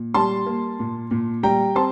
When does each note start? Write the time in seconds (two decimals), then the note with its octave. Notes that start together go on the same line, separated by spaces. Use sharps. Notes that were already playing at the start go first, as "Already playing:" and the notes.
Already playing: A#2
0.14 G3 A5 C6
0.46 A#3
0.79 A#2
1.11 A#2
1.43 G3 G5 A#5
1.75 C4 A5 C6